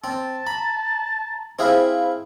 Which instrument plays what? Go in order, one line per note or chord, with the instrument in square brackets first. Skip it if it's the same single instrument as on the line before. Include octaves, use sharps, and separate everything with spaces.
[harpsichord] C4 [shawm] A5
[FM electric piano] A#5 [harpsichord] B5
[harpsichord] C4 E4 G#4 [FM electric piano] C5 F5 B5